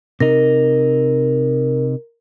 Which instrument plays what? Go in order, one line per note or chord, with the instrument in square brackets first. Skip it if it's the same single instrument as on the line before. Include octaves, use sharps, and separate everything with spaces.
[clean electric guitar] C3 D#4 [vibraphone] A#4